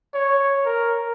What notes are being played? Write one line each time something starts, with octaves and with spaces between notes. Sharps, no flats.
C#5
A#4